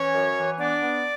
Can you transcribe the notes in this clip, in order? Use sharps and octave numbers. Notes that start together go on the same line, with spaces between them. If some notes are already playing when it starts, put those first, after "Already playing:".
Already playing: E3 C#4 C#5
F#2
E3
B3 D4 D5
B3